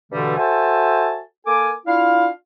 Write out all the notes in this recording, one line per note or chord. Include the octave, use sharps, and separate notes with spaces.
G2 B2 D3 E3 G3 A3
F#4 A4 C5 E5 G#5 A5
A#3 A4 A#4 G#5 D6
D4 E4 F4 F5